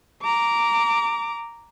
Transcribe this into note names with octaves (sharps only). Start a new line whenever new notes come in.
A#5 D6